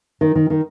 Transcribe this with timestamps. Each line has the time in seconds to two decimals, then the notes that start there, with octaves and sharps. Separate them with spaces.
0.21 D#3
0.35 D#3
0.50 D#3